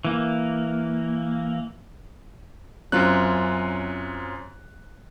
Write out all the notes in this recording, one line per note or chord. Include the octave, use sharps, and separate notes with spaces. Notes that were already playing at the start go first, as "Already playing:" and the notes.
E3 A#3
F#2 F#3 C4 C#4 F4 F#6